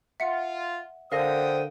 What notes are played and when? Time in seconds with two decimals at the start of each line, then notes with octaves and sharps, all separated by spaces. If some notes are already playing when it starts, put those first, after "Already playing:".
0.20 F4 E5 F#5 C#7
1.12 D3 A#4 C5 F5 G5 D#6 A#6